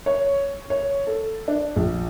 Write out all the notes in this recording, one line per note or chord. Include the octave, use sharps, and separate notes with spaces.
C#5
C#5
A4
D4
A#1